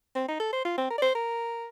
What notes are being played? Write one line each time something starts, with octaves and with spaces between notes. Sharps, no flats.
C4
D#4
A4
C5
F4
C4
A#4
D5
C5
A#4